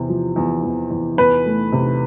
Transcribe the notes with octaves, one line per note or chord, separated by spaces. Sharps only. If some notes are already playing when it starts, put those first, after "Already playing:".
Already playing: E2 C3
F3
E2
E2
E2
E2 B4
A3
C3